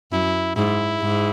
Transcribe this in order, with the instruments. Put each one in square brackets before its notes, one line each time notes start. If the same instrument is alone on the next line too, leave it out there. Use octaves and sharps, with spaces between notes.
[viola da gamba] F#2 [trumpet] E4
[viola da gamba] G#2 [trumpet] E4
[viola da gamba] G#2